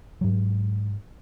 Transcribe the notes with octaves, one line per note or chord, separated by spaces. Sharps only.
G#2 F#3